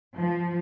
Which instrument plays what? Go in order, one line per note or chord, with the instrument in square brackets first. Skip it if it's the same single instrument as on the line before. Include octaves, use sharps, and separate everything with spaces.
[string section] F3